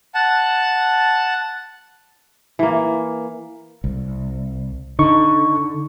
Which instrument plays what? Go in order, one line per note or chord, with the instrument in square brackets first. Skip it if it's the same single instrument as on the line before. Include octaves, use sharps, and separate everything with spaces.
[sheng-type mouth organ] F#5 A5
[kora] E3 A#3
[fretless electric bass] C2
[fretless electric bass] D3 [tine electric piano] D#4 C#6